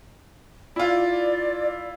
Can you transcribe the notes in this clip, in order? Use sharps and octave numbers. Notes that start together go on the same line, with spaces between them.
E4 F4 D5